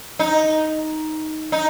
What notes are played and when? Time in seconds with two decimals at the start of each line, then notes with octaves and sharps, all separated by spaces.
0.19 D#4
1.52 D#4